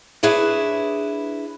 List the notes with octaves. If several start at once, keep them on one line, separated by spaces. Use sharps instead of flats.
D4 E4 G#4 B4 C#5